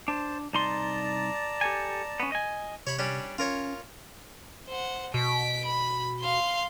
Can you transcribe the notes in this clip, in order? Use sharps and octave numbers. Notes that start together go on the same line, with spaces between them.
D4 C5 A5
C2 D#4 D5 A5 A#5 C6
G4 A4 G#5
B3 C#4
D#5 G#5
C3 C#5 B5
G3 C#4 D4
C#4 F4 A#4 C#5
C5 F#5
B2 B6 D7
B5
F5 C6